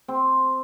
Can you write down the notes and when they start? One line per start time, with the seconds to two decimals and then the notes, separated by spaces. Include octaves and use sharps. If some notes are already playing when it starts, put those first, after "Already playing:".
0.08 C4